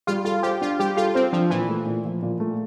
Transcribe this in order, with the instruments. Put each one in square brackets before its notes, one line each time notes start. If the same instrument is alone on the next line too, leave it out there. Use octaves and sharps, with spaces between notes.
[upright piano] G3 [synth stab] F4
[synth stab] F4 [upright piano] A4
[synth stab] G4 [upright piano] C5
[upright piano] D4 [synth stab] F4
[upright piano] G3 [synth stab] G4
[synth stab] F4 [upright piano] A4
[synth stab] C4 [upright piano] C5
[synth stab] F3 [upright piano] D4
[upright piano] A#2 [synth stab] E3
[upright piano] A3
A#2
F3
A#2
A3